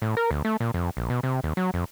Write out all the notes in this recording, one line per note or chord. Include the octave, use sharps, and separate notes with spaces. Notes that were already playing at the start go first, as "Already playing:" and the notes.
A2
A#4
D2
A3
A#2
F2
A#1
B2
C3
D#2
F#3
F2